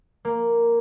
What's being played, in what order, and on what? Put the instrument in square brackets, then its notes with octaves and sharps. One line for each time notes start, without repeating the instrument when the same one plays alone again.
[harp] A#3